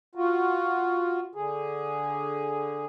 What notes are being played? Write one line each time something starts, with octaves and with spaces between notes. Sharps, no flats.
F4 F#4
D3 G#4